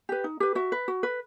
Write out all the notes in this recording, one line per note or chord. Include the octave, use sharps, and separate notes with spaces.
G4 B4
D#4
G4 B4
F#4 E5
B4
F#4
B4